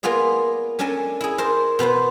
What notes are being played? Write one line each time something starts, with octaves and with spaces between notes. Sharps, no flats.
A#3 B3 F4 G#4 D5
C#4 D4 A4 A#4 G#5 A5
E4 G#4
A#4 C5 A5
B2 B3 B4 C5